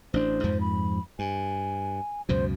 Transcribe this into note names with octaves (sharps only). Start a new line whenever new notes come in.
A1 D4 C5
F2 G#2 F3
B5
G2 G#5
C#2 F#2 B2 C5